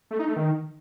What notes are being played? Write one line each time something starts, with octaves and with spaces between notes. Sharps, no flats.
A3
D#4
A3
D#3